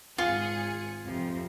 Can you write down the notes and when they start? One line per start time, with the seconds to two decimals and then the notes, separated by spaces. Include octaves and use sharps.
0.18 G#1 F4 G#4 C#7
1.04 F2 C3 F3